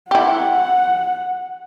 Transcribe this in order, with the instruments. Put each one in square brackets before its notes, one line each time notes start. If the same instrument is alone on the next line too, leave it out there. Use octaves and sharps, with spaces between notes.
[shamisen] E4 G4 [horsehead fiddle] F#5